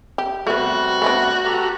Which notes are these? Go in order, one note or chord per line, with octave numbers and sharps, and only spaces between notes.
G4
C3 G3 A3 B3 F#4
A3 B3 D4
G4 A4 A#5